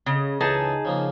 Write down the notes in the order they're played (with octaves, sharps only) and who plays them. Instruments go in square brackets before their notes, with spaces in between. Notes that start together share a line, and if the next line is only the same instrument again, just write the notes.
[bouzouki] C#3 [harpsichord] D#5
[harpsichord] C#2 E3 [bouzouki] D#4 G#4 A5
[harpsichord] C#3 F3 A#3